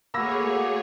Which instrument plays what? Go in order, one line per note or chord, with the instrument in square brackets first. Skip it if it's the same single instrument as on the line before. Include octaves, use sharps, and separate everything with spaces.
[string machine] A3 G#4 C#5 [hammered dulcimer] A#3 F#4 [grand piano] B5 E6 A#6